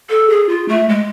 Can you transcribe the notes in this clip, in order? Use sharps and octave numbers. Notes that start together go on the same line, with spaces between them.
A4
G#4
F4
A3
G#3